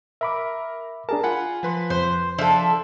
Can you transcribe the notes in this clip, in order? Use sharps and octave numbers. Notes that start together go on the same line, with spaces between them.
A#4 E5 B5 D6
D4 G#4 A#4 A5
F4 F#5 G#5 B5
F3 B4 C6
F2 C5
F3 D4 A4 E5